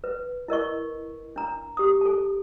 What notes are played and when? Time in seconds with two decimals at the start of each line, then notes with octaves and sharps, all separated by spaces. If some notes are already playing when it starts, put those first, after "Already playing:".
0.04 B4
0.48 E4 A#4 D#5 C#6
1.36 D4 A#5
1.77 G4 D#6
2.01 A4 A5